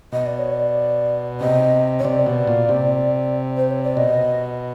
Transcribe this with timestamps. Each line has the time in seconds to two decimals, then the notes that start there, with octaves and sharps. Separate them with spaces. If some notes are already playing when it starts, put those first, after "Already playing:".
0.12 B2 D#5
0.26 D5
0.38 C#5
0.53 D5
1.40 C3 D#5
1.99 C#5
2.05 C3 D5
2.26 B2
2.47 A#2
2.69 C3
3.57 C5
3.71 C#5
3.83 D5
3.97 B2 D#5